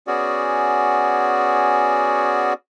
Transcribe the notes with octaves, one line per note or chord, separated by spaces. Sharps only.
B3 C#4 F#4 G#4 D5